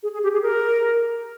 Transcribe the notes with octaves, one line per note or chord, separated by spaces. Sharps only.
G#4
G#4
G4
G#4
A#4